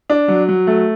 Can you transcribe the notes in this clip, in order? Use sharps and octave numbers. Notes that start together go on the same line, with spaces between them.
D4
F#3
F#3
A3